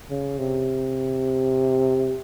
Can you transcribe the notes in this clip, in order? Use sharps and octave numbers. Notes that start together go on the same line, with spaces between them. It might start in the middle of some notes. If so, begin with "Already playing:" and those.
C#3
C3